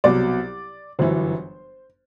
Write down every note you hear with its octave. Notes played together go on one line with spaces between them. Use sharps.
C2 B2 F#3 D5
G1 F#2 E3 C5